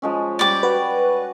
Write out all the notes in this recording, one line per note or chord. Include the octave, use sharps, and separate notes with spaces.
F3 G#3 C#4
G3 G4 D5 D6
F#4 B4